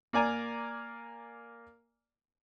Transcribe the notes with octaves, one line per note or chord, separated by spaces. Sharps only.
A#3 D5 G#5 A#5